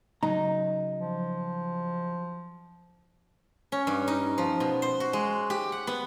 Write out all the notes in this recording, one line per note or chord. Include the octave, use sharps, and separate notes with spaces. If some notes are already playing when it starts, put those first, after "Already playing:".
C#3 F#3 D#4 A#5
F3
C#4
G2
D#4
F3
B2
C5
F#4
G#3
G4
F#5
B3